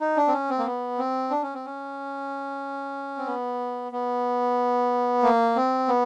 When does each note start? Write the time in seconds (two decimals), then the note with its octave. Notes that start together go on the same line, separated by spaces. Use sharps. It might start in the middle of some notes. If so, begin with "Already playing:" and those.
0.01 D#4
0.17 D4
0.28 C4
0.33 C#4
0.50 C4
0.59 A#3
0.66 B3
0.98 C4
1.30 D4
1.42 C#4
1.54 C4
1.66 C#4
3.18 C4
3.27 B3
3.92 B3
5.23 A#3
5.56 C4
5.88 B3